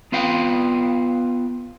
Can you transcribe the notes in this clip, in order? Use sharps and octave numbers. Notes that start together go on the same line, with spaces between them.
B3 F4 B4 F5 G5